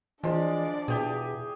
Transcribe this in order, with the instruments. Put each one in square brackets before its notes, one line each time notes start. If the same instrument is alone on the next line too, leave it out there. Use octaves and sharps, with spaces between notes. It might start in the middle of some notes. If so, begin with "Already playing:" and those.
[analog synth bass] E3 [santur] F3 [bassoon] G#3 [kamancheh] D4 D5
[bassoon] E2 [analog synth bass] B2 [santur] G4 G#4